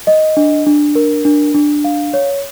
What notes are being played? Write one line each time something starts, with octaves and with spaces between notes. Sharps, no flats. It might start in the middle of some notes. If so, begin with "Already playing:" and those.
D#5
D4
D4
A#4
D4
D4
F5
C#5